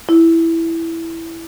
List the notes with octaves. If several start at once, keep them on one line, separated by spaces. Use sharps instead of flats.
E4